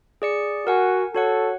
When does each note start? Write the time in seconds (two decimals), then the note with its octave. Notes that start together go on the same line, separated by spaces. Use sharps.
0.22 G#4 D5 C#7
0.67 F#4 A#4 F#5 G#5
1.15 F#4 A4 C#5 F#5